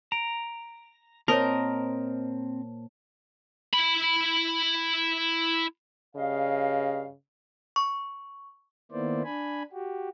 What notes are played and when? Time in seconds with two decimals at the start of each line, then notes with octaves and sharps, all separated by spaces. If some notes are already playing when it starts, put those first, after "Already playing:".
0.12 A#5 D7
1.28 A#2 C4 A#4 C5 C#5 D#5 A5
3.73 E4 B5
6.16 G2 C#3 D#5 F5
7.76 C#6
8.92 D#3 A#3 B3 E4 C5 D5
9.24 D4 G#5 B5
9.73 F#4 G4